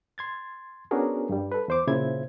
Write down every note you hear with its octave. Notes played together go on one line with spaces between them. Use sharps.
C6 G#6 A6
B3 C#4 D4 F#4 G#4 A#4
G2 G3
A4 B4
E2 C5 D6
A#2 C#3 E4 C5 G#6